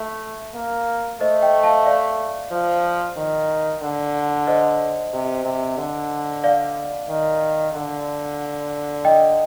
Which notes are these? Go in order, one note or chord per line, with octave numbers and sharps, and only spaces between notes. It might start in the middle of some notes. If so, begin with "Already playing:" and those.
Already playing: A3
A#3
A3 C5 D#5
D#5 G5
F5 A5
D5 F5
F3
D#3
D3
C5 D#5
C3
C3
D3
D5 F5
D#3
D3
D#5 G5